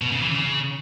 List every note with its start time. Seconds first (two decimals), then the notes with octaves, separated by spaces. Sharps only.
0.02 B2
0.11 C#3
0.21 E3
0.30 C#3